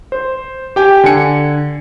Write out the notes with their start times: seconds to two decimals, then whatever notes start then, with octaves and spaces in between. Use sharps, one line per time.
0.12 C5
0.76 G4 G5 G#5
1.04 D3 G#5 C#7